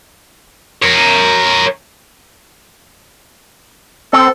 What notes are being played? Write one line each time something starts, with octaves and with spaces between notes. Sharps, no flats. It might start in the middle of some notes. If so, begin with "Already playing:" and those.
A#4 C#5
C4 A4